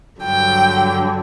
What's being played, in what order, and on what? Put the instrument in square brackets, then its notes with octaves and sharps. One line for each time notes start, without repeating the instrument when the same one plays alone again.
[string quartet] G2 D3 F#3 G5